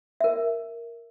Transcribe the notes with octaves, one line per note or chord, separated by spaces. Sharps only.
A#4 E5